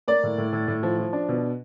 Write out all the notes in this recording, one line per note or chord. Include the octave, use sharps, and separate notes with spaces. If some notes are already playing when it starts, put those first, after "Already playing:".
A#3 D5
A2
A2
A2
A2
F3
F3
D4
B2